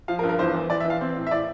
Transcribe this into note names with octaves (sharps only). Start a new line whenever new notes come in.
F3 F5
A#4
G2
A#4
E2 C5
E3
E3 D5
E5
E3
F5
C4
A2
E5
A2 D5